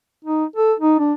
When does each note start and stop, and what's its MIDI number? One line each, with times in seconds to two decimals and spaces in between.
0.25 0.45 63
0.56 0.73 69
0.80 0.98 63
0.99 1.13 62